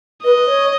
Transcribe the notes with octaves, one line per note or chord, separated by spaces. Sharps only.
B4 D#5
B4
C#5